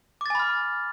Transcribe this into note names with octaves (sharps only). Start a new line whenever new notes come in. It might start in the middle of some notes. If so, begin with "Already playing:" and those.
G#5 B5 D6 F6 A6